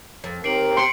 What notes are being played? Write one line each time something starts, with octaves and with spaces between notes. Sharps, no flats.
F2
D#2 D#3 C4 G4 A#4 C7 D7 F#7
B3 C6 C7 C#7